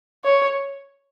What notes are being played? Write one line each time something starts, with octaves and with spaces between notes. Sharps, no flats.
C#5